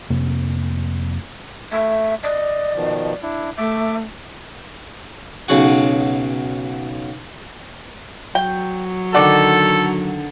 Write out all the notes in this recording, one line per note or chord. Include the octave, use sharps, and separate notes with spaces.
F2 C3 A#3
A3 E5
D5 D#5
B2 D#3 F3
D4 E4
A3 E5 D6
B1 C#3 F#4
F#3 G5
D3 D#3 D4 A4 D5 F#5 B5